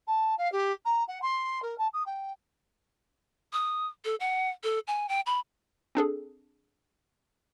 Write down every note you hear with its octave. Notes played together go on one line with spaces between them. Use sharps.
A5
F5
G4
A#5
F#5
C6
A#4
A5
D#6
G5
D#6
A4
F#5
A4
G#5
G5
B5
C4 D4 G#4 A4